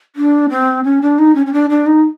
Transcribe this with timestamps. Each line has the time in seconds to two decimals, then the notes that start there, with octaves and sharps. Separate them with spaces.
0.16 D4
0.50 C4
0.84 C#4
1.02 D4
1.19 D#4
1.35 C#4
1.46 C#4
1.53 D4
1.70 D4
1.87 D#4